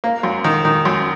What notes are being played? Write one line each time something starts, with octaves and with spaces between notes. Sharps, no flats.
A#3
F#2
D#3
D#3
F#2